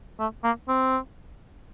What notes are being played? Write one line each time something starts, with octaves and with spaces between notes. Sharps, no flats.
A3
A#3
C4